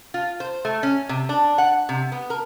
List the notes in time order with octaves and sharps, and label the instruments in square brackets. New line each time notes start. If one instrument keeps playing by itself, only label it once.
[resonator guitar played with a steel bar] F4
C5
A3
C#4
C3
D4
F#5
C3
B3
A#4